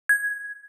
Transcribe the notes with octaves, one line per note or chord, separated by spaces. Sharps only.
G#6